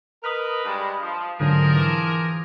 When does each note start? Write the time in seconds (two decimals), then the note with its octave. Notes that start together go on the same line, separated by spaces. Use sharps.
0.24 A#4 B4 D#5 B5 D#6 F6
0.65 G2 G#3 D4
1.01 F3
1.40 G#2 D3 F3 F#3 G#4 A#4
1.75 E3 D6 E7